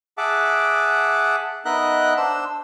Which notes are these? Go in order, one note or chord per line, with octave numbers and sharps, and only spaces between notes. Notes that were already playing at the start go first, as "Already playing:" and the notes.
G#4 E5 F#5 A5 D6
B3 D#4 A#4 D#5 E5 F#6
D4 C5 E6